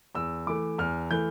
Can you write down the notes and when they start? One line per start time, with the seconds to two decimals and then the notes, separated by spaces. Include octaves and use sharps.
0.15 E2 E6
0.47 E3 A3 D6
0.78 E2 F6
1.11 E3 A3 G6